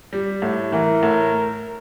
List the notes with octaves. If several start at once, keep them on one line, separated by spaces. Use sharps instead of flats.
G3
A2
E3 A#4
A2